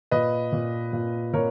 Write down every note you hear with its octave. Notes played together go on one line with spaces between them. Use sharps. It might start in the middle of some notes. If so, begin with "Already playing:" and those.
A#2 B4 D#5
A#2
A#2
A#2 A#4 C#5